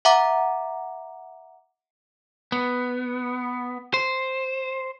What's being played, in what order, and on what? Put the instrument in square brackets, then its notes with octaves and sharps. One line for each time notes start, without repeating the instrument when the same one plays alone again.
[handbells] E5 F#5 A#5 D6
[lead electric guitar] B3
C5